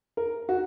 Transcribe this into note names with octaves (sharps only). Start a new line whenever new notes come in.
A#4
F#4